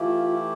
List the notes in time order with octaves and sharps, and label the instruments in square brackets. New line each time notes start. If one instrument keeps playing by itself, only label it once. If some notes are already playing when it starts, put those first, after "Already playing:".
Already playing: [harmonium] E3 A3 E4 G4 [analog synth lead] F4